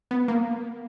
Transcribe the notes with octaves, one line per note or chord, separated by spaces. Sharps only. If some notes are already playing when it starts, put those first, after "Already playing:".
B3
A#3